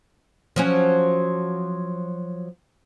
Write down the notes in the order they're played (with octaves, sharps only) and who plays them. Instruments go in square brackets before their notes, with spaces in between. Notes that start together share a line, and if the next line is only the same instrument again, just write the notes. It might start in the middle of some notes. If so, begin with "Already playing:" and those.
[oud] F3 F#3 C#4